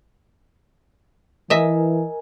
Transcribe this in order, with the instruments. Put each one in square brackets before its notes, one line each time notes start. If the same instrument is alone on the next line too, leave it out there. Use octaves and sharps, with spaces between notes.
[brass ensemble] E3 [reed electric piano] A#4 G#5 [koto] D#5 E5